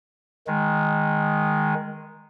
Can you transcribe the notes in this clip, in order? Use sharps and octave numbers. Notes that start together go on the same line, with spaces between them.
D#3 G#3